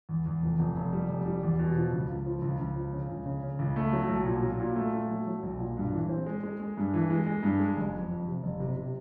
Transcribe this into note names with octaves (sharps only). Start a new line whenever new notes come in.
E2
E2
F1
F1
F1
G3
F1
G3
E2
B2
F3
C#2
C#2
F3
C#2
C#2
F3
C#3
C#2
C#3
C#3
C#2
A3
F#3
B1
A#2
F#3
A#2
A3
A3
F#3
F#3
B1
A#2
G2
E3
C4
G#3
G#3
G#3
G2
E3
G#3
G#3
G2
G#3
F#1
F2
F2
C3
F#1
C3
C3